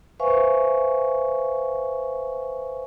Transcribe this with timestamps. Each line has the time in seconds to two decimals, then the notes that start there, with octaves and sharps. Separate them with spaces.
0.20 B4 C5 E5 F5 G#5 C#6